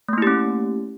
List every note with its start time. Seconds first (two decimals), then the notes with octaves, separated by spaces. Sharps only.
0.08 A3
0.13 A#3
0.18 E4
0.22 G4
0.27 C#4